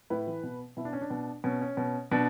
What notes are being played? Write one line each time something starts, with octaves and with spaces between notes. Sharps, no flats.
A2 B4
E3
B2
B2 E4
D4
C#4
D4
B2
B2 C#4
C#4
B2
B2 D4